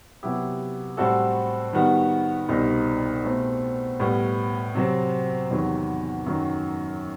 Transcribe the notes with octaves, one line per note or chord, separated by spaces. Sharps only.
C3 F#3 B3 E4 G4
A2 G3 C4 F#4 A4
D#3 G3 B3 F#4
C2 B2 G3 C4 D#4
B2 A3 C4
A2 G3 B3
C3 F#3 C4
E2 C3 D#3 F#3
F#2 D#3 F#3